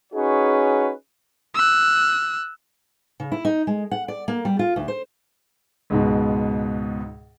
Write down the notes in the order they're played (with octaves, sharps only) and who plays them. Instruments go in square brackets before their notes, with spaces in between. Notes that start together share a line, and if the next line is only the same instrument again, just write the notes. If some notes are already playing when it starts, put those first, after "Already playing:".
[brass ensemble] C#4 D#4 F#4 G#4 B4 C#5
[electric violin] E6 F#6
[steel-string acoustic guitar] C#3
E4
D#4
G#3
F#5
D5
A#3
G3
F4
D2
C5
[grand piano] C#2 G#2 B2